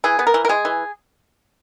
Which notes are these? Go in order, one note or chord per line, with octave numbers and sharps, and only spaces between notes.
E3 G#4
B3
A#4
E3
A#4
G#3 G#4
E3